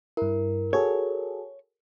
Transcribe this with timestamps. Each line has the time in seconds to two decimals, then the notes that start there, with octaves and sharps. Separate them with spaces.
0.17 G2 E4 A#4
0.73 F#4 G#4 A4 C#5